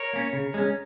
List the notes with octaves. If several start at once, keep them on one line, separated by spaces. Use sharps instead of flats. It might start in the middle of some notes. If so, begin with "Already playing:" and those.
Already playing: A#4 C#5
A#3 C#4
C#3
G#3 C#4